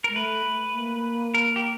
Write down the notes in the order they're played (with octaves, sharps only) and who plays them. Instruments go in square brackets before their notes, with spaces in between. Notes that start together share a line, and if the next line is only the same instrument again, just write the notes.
[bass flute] G#3 [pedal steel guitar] A#4
[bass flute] A3 [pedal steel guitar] B4
[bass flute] A3
A#3
[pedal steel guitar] A#4
G4